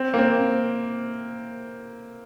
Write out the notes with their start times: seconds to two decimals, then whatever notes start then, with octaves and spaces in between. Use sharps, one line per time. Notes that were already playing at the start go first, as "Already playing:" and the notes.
Already playing: C4
0.14 A#3
0.18 C4